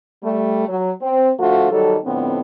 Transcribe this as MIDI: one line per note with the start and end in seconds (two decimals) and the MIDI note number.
0.23 0.65 55
0.23 0.65 57
0.68 0.91 54
1.02 1.31 60
1.40 1.70 50
1.40 1.70 53
1.40 1.70 57
1.40 1.70 65
1.40 1.70 66
1.72 1.97 51
1.72 1.97 54
1.72 1.97 55
1.72 1.97 69
2.05 2.41 41
2.05 2.41 45
2.05 2.41 50
2.05 2.41 59
2.05 2.41 60